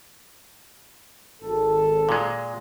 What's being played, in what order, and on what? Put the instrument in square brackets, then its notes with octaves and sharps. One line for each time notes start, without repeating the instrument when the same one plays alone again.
[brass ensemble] G#1 A4
[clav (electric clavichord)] A#2 G#3